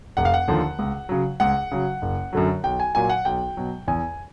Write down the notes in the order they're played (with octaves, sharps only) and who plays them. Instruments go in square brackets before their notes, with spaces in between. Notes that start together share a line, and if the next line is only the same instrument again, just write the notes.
[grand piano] F1 F#5
F5
F#5
D#2 D3 F3
C#2
C#3 F#3
C#2 F#5
C#3 F#3
F#1
F#2 D3 F#3
B1 G5
G#5
A#2 F#3 G#5
F#5
B1 G5
B2 F#3
E2 G#5